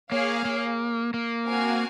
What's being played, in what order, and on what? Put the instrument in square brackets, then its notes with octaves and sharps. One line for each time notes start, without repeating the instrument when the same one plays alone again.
[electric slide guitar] A#3 [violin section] G#4 C#5 F5
[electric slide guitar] A#3
A#3
[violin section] C4 F#4 A#4 F5 G#5